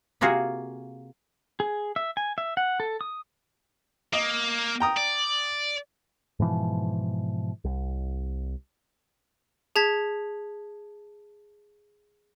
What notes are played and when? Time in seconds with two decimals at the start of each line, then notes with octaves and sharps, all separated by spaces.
0.21 C3 A#3 F4 F#4 G#4
1.60 G#4
1.96 E5
2.17 G#5
2.38 E5
2.57 F#5
2.80 A4
3.01 D#6
4.13 A#3 D#5
4.80 G5 A#5 D#6
4.97 D5
6.39 G#2 B2 E3 F3
7.64 C2
9.76 G#4 A5 G#6 B6